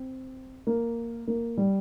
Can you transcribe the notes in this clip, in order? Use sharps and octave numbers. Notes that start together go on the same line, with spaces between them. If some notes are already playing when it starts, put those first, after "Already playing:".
Already playing: C4
A#3
A#3
G3